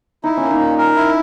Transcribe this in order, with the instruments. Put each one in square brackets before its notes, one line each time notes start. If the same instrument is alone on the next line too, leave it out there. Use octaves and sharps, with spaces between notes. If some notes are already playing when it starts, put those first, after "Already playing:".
[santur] D#4 [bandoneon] E4
[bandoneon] A#3 [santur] C#4
[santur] D#4
[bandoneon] A#2
A#4
E4